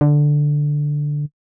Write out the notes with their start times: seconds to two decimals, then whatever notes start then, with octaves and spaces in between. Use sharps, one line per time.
0.01 D3